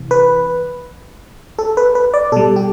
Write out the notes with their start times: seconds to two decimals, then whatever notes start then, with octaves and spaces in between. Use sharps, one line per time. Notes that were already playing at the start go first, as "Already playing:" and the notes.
Already playing: C3 E3
0.11 B4
1.59 A4
1.77 B4
1.95 B4
2.14 D5
2.32 B2 A4
2.36 G3
2.56 G4